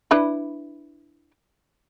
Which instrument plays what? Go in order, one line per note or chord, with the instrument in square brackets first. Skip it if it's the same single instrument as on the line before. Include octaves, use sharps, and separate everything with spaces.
[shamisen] D4 E4 B4